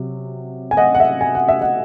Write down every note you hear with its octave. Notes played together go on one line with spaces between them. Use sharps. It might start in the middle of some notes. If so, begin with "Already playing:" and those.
Already playing: C3 F#3
G#5
D#5 F#5
F#5
E5
G#5
F#5
E5
D#5 F#5